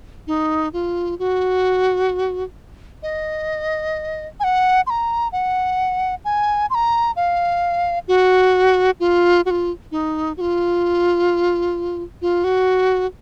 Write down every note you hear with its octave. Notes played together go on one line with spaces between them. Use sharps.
D#4
F4
F#4
D#5
G#5
F#5
C6
A#5
F#5
G#5
C6
A#5
F5
F#4
F4
F#4
F4
D#4
F#4
F4
F4
F#4